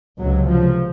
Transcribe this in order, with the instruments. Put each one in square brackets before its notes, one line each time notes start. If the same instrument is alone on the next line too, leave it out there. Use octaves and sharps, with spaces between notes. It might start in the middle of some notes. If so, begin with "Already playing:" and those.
[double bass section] C#2 C3 F#3
F3